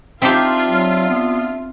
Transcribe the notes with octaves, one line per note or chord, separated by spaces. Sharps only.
C4 D4 D#4 F4 G4 E5
F#3
B3